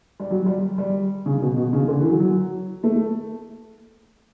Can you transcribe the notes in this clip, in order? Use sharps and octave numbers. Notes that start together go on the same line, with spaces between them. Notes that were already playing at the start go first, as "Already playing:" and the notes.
G3
F#3
G3
G3
C#3
B2
B2
C#3
D3
E3
F#3
F#3
A3